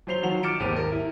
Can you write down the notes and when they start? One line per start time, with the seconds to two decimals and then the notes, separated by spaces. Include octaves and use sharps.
0.07 F#3 F4 C5 C7 F7 G7
0.22 D#3 F3 F#3 F#4 F7
0.43 D6 F6 A6 C#7 D7 E7
0.60 G#1 D#2 G4 D#7
0.73 G4 A#4
0.92 E4